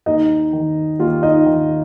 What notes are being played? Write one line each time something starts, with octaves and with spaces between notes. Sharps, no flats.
D#2 D#4 D#5
D#3
D#2 F4 F5
D#4 D#5
D#3